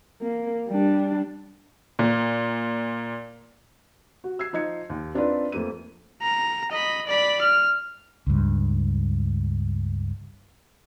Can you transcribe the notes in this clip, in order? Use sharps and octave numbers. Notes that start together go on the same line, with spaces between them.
A#3
G3 D4
A#2
F#4
E6 G#6 C7
F3 D#4 D#5 G#6 C#7
D#2
C4 D4 D#4 F4 B4
F2 A3 A#3 D#7
A#5
D#5 B5
D5 B5
F6
C#2 G2